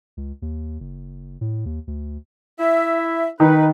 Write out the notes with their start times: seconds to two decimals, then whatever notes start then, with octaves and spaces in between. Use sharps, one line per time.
0.17 C#2
0.42 D#2
0.80 F#1
1.41 A2
1.66 D#2
1.87 D2
2.60 E4 E5
3.40 D#3 D#4 B4